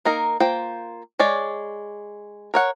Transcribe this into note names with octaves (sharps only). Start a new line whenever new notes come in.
A#3 D#4 A#4
A#3 F4 C5 G5
G#3 C#5 D5
A#4 C#5 F#5